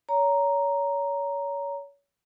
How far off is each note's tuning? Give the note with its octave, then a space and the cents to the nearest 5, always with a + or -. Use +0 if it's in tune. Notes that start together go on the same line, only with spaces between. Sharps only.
C#5 +30 A#5 +0